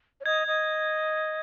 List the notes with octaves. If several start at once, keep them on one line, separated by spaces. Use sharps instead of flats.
C#5
D#5 G#6
D#5